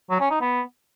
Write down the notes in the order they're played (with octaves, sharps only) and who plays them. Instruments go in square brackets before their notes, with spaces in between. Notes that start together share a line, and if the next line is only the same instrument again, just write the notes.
[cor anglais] F#3
C#4
D#4
B3